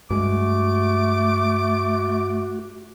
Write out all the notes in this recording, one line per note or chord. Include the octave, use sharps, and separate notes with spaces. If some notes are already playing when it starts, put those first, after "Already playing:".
G2 G#3 A3 F#4 D6